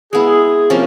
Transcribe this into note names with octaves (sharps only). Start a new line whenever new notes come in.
G#3 B3 E4 G#4
C3 F3 A#3 C#4